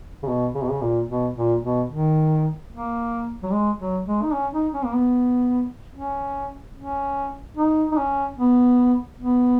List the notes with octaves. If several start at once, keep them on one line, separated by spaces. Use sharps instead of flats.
C#3
B2
C#3
B2
C#3
A#2
B2
A#2
B2
D#3
A#3
F#3
G#3
F#3
G#3
D#4
C#4
D#4
C#4
A#3
B3
C#4
C#4
D#4
D#4
C#4
B3
B3